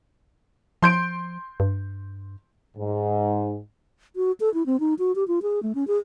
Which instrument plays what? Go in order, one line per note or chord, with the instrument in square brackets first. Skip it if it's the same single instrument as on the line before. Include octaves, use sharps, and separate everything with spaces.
[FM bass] F3 [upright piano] C6 G6 D7
[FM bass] G2
[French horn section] G#2
[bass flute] F#4
A4
E4
C4
D#4
F#4
G4
F4
G#4
A3
C#4
G#4